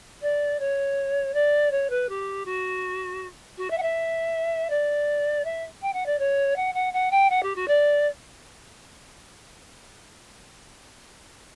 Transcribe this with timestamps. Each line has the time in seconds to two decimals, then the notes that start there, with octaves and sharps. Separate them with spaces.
0.22 D5
0.59 C#5
1.34 D5
1.71 C#5
1.90 B4
2.09 G4
2.45 F#4
3.58 F#4
3.70 E5
3.78 F#5
3.82 E5
4.70 D5
5.44 E5
5.82 G5
5.93 F#5
6.06 D5
6.19 C#5
6.56 F#5
6.74 F#5
6.93 F#5
7.11 G5
7.30 F#5
7.43 G4
7.56 F#4
7.68 D5